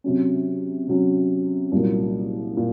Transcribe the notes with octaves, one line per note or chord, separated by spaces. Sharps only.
C3 F#3 C#4
C3 F#3 C#4
C2 A#2 F#3 A#3
A#2